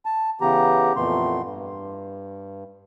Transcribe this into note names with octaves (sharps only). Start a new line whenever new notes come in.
A5
C#3 E3 B3 G4 A#5
F2 A#2 E3 A3 B3 C6
G2